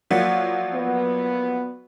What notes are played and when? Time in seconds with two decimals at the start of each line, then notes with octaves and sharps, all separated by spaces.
0.11 F3 F#3 A#3 F#4 D5 F#5
0.74 B3